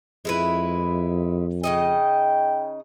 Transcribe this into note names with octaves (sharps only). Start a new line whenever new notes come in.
F2 G#3 E4 B4
C#3 D#4 D#5 G5